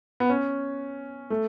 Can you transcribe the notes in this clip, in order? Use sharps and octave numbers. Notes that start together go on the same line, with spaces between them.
B3
C#4
A3